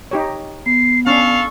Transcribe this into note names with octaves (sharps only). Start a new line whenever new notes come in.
D#4 G4 C#5
B3 C7
C#4 D4 A4 F5 C#6